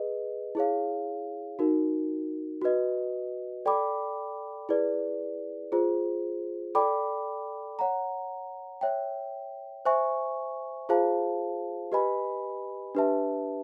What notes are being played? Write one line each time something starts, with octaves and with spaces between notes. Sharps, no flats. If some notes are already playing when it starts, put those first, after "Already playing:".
Already playing: G#4 B4 D#5
E4 G#4 C#5 F5
D#4 F#4 A#4
F#4 B4 D#5
A4 D5 G5 B5 D6
E4 G#4 B4 D5
F4 G#4 C5
A4 D5 G5 B5 D6
C#5 F#5 A#5
C#5 E5 G5
C5 E5 G#5 C#6
F4 G#4 C5 F5 A5
G4 B4 D#5 G#5 B5
D4 G4 B4 E5 A5